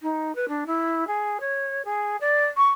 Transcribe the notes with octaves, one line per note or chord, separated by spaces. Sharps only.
D#4
B4
D4
E4
G#4
C#5
G#4
D5
C#6